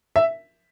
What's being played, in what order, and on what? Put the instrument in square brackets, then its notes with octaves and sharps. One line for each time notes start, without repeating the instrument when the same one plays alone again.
[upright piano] E5